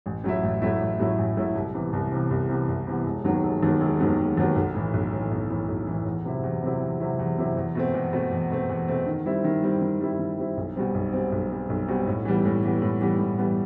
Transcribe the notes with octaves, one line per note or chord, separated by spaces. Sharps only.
A1
A2 F#3 A3 E4
A1
A2 F#3 A3 E4
A1
A2 F#3 A3 E4
A1
A2 F#3 A3 E4
C2
C3 E3 B3
C2
C3 E3 B3
C2
C3 E3 B3
C2
C3 E3 B3
E1
D#2 D#3 F#3 B3
E1
D#2 D#3 F#3 B3
E1
D#2 D#3 F#3 B3
E1
D#2 D#3 F#3 B3
B1
A2 E3
B1
A2 E3
B1
A2 E3
B1
A2 E3
E2
C3 F#3 C4 E4
E2
C3 F#3 C4 E4
E2
C3 F#3 C4 E4
E2
C3 F#3 C4 E4
E2
B2 A3 C4
E2
B2 A3 C4
E2
B2 A3 C4
E2
B2 A3 C4
D#3
G3 C4 E4
D#3
G3 C4 E4
D#3
G3 C4 E4
D#3
G3 C4 E4
B1
B2 G3 C4
B1
B2 G3 C4
B1
B2 G3 C4
B1
B2 G3 C4
A2
E3 G3 B3
A2
E3 G3 B3
A2
E3 G3 B3
A2
E3 G3 B3